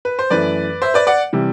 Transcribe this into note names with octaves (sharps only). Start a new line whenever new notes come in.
B4
C5
F#2 E3 A3 B4 D5
C5 E5
B4 D5
D5 F#5
C3 E3 G3